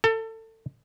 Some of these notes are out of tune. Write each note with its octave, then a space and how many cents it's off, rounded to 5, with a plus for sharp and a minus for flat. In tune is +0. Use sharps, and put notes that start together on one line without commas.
A4 +25